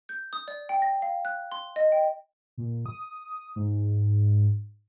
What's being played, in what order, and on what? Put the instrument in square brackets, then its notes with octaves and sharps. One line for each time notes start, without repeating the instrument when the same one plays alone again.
[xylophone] G6
D#6
D5
G5
A#6
F5
F#6
C6
D#5
G5
[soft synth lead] A#2
D#6
G#2